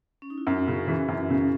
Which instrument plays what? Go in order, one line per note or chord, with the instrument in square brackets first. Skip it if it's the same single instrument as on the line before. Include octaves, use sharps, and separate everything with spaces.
[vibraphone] C#4
D#4
E4
[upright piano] F#2 [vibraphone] D#4 F#4
[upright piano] C#3
E3
F#2
C#3